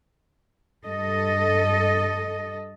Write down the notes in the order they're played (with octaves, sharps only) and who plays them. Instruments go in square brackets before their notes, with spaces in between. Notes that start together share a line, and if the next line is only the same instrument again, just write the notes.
[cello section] G2 A4 D#5